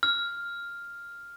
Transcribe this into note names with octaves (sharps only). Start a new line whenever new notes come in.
F6